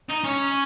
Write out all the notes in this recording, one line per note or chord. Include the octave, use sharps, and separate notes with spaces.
D#4
C#4